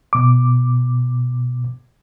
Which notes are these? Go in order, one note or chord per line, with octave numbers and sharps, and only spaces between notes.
B2 D6